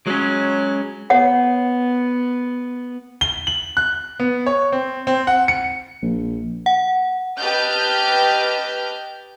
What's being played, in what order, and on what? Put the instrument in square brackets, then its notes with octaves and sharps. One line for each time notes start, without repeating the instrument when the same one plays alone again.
[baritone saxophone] F#3 [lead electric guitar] G#3 C#4
[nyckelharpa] B3 [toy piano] C#5 F#5
[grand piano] G7
F#7
F#6
B3
C#5
C4
C4
F#5
C#7
[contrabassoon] A#1
[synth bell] F#5
[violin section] G4 B4 D#5 A5 F6 G6